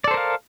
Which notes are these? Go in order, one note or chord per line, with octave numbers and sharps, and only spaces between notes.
A4 A#4 C5 D5 F5